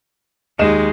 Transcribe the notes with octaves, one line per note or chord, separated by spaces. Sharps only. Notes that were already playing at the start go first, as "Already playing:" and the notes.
D#2 G#3 D#4 E7